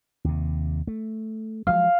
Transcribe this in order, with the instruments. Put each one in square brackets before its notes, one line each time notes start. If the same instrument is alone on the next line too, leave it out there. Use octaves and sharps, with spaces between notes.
[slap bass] D#2 C3
A3
[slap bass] F3 F#3 G#3 [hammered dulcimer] F5